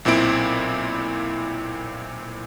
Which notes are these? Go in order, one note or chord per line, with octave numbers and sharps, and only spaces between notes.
B1 A#2 C4 E4 D7